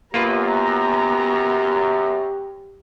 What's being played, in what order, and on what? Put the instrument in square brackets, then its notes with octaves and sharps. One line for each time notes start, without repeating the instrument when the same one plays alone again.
[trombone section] F#2 [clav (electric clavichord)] A#3 F4 B4 [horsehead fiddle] B3 A#5 [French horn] G4